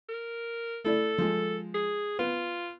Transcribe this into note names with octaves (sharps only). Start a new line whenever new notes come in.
A#4
A3 E4 A4 D5
F3 G#3
G#4
B3 F4